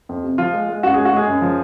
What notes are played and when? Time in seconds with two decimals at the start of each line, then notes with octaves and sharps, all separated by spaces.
0.09 F2
0.24 C3
0.38 F3 F4
0.53 G#3
0.69 G#3
0.83 F#2 F#4
0.94 G#4
0.97 G#3
1.05 F#4
1.13 G#3 G#4
1.27 F#2
1.42 F3